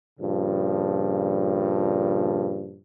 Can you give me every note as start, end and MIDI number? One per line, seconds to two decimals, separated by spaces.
0.20 2.80 43
0.20 2.80 46
0.20 2.80 49
0.20 2.80 53